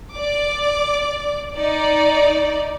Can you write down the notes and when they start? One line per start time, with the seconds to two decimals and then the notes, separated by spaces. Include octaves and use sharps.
0.13 D5 D6
1.55 D#4 D5